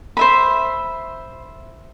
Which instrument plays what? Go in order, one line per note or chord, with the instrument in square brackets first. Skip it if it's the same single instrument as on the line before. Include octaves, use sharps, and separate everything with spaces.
[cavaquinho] C5 E5 B5